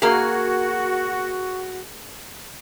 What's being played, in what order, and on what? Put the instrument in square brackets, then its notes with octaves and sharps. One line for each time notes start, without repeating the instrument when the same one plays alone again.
[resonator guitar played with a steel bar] A#3 G#4 [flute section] F#4